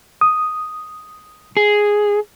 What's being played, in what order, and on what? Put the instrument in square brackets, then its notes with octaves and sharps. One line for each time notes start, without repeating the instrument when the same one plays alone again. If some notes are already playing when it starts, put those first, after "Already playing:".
[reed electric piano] D#6
[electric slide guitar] G#4